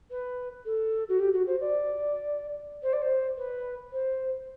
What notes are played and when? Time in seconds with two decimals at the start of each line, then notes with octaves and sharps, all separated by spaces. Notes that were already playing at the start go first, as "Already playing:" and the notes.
0.10 B4
0.65 A4
1.08 F#4
1.19 G4
1.33 F#4
1.46 C5
1.60 D5
2.82 C5
2.92 D5
3.01 C5
3.37 B4
3.92 C5